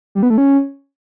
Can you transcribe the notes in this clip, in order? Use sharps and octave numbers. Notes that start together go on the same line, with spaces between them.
G3
B3
A3
C#4